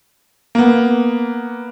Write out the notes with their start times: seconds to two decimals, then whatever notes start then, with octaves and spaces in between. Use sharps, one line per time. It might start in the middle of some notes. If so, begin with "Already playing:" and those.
0.55 A#3 B3